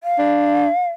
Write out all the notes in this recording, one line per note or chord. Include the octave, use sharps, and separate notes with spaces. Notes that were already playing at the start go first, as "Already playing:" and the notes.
F5
D4